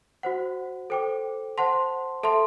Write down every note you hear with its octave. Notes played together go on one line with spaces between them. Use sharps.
F#4 C5 F#5
A4 C5 G5 D6
C5 F#5 A5 C6
A4 E5 A5 C6